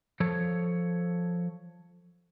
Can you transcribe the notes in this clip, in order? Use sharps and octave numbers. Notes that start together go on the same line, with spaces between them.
F3 A4 C#5